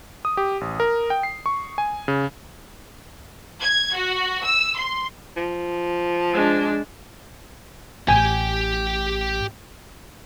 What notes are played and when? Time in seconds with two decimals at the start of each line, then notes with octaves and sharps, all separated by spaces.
0.25 D#6
0.37 G4
0.61 A1
0.80 A#4
1.10 G5
1.23 C7
1.46 C#6
1.78 G#5
2.08 C#3
3.61 G#6
3.95 F#4
4.44 E6
4.78 C6
5.37 F3
6.33 G#3 D4
8.08 A1 A2 G4 G5 G#5